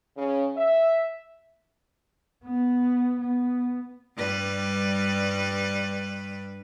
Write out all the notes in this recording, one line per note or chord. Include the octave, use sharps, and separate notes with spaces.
C#3
E5
B3
B3
G2 G3 B4